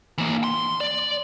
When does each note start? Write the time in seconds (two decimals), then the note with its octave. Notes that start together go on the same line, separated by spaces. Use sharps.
0.18 E3 A#3
0.44 C6
0.81 D5